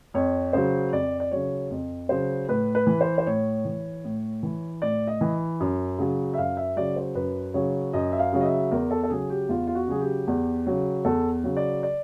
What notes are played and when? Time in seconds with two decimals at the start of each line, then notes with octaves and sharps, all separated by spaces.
0.14 F2 C#5
0.53 C#3 F#3 C5
0.92 F2 D5
1.20 D5
1.31 C#3 F#3 C#5
1.71 F2
2.09 C#3 F#3 C5
2.48 A2 B4
2.75 B4
2.87 E3
3.01 C5
3.18 C5
3.26 A2 C#5
3.65 E3
4.04 A2
4.43 E3
4.82 A2 D5
5.07 D#5
5.21 E3
5.60 F#2
5.99 C#3 F#3
6.33 E5
6.38 F#2 F5
6.57 E5
6.76 C#3 F#3 D5
6.96 C5
7.15 F#2 B4
7.54 C#3 F#3 C#5
7.93 F#2 D#5
8.12 E5
8.19 F5
8.33 C#3 F#3
8.41 D#5
8.46 E5
8.71 E2 A#4
8.91 A4
9.03 A4
9.10 C#3 F#3 G#4
9.30 G4
9.49 E2 F4
9.67 F4
9.75 F#4
9.87 C#3 F#3 G#4
10.01 G4
10.27 E2
10.67 C#3 F#3
11.05 E2 A4
11.44 C#3 F#3
11.57 D5
11.83 D5